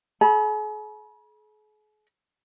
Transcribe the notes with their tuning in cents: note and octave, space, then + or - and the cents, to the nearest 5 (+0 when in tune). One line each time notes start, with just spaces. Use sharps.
G#4 +45 B5 -40